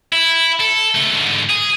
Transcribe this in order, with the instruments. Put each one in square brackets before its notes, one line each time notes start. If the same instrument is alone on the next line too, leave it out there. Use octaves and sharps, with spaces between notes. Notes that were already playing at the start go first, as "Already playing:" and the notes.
[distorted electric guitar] E4
A4
C#2 A3
G#2 D3
G#4